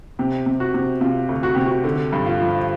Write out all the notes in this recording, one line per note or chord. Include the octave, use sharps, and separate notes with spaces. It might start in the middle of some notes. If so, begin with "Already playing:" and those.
C3 G4
C3
F#4
C3
C3 F4
D2
F#4
C3 G4
F#4
D3
G2
F4
F3